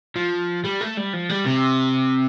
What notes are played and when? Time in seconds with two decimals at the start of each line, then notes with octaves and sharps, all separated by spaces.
0.16 F3
0.64 G3
0.81 A3
0.97 G3
1.13 F3
1.29 G3
1.46 C3